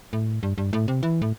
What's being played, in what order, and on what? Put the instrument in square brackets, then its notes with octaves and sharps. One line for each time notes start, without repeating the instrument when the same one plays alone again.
[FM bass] A2
G2
G2
A2
C3
E3
A2